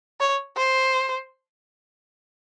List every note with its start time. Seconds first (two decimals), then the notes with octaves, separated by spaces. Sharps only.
0.20 C#5
0.57 C5